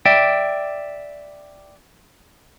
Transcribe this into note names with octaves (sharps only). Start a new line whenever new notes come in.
D5 E5 G5